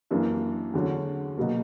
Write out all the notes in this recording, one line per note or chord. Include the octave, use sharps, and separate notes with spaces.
F#2 E3 A#3 D4
E2 D3 F#3 C#4
B2 F#3 A#3